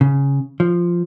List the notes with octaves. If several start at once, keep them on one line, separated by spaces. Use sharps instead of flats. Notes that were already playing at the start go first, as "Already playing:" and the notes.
C#3
F3